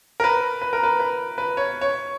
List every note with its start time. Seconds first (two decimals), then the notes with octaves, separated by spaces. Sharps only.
0.20 A#4
0.24 B4
0.62 B4
0.73 A#4
0.83 B4
1.00 B4
1.38 B4
1.57 C#5
1.81 C#5